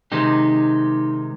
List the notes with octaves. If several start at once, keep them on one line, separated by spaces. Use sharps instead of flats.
C3 D#3 G#3 D#4 G4